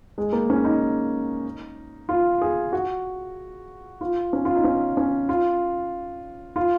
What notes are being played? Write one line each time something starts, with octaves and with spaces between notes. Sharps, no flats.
G#3
A#3
C#4
D#4
F4
G#4
F#4
F4
C#4
F4
D#4
C#4
C#4
F4
F4